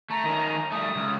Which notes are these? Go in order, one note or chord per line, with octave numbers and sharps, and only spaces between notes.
A3 A#5
D#3 C#4
G3 A3 D#6
C#2